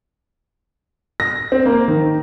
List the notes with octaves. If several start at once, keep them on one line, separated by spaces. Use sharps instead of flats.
A#6
C4
A#3
D#3